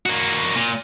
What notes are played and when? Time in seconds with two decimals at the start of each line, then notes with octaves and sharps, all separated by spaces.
0.06 A#3 F#4
0.56 A#2